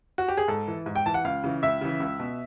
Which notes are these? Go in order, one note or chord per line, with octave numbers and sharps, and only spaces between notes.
F#4
G4
G#4
G#2 A4
E3
G#2
G5
E3 A5
F#5
C#2 F5
C#3 E3
C#2 E5
C#3 E3
C#2
B2